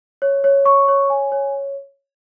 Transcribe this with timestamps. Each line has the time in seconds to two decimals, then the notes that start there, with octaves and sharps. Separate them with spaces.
0.22 C#5
0.44 C#5
0.65 C#6
0.88 C#5
1.10 G#5
1.32 C#5